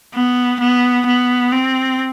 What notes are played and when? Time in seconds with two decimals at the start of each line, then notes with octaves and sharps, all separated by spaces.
0.14 B3
0.60 B3
1.06 B3
1.52 C4